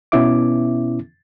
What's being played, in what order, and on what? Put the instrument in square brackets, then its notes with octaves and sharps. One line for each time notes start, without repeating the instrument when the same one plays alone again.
[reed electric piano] B2 B3 C#4 E4 E5 D6